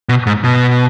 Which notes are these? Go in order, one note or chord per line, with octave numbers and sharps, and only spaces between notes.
B2
G#2
B2